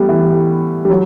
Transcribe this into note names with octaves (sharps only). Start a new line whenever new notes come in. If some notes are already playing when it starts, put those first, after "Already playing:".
Already playing: G3 A3 B3
E3
G3
F#3